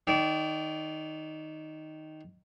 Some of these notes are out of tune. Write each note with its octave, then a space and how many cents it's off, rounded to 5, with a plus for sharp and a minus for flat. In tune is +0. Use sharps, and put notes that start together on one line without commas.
D#3 +0 D5 -25